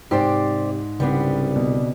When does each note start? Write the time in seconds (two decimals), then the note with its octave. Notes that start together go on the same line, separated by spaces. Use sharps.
0.11 G#2 C3 G4 C5 D5
1.00 C2 C#3 G3 B3 C4 D4
1.56 B2